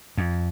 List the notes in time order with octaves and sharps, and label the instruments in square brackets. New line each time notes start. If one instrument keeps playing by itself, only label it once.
[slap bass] F2